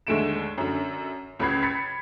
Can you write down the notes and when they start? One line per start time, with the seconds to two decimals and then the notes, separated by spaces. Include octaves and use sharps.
0.07 D#2 D3 G#3 A3 D7 E7
0.58 F#2 D3
1.39 C#2 C#3 B4 B5 G#6 C7
1.62 B5 G#6 A6 B6 C#7